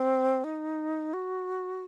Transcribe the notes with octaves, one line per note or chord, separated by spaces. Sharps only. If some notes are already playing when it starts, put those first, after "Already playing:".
Already playing: C4
D#4
F#4